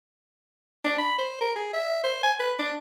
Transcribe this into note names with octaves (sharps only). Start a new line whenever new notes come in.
D4
B5
C5
A#4
G#4
E5
C5
G#5
B4
D4